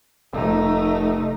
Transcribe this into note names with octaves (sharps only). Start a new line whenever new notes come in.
F1 A3 D#4